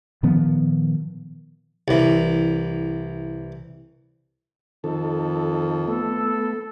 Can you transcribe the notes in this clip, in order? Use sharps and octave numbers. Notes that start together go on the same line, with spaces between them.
A#2 D#3 F3 B3
C2 E3
F2 D#3 A4
A3 B3 A4